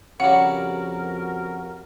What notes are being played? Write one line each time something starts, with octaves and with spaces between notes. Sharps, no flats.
F2 C#3 G3 F#4 A#4 F#5